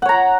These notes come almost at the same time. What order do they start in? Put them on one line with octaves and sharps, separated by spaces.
F#5 C#5 A#5